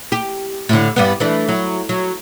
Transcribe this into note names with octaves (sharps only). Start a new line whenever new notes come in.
G4
A2 D3
G2 G3 B3
E3 A3 D4
F#3
F#3